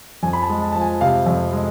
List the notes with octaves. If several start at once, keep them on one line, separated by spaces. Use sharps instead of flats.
F2 G#5
B5
A5
G#3
A5
F3 A5
G#5
C3 F5
F2
G#3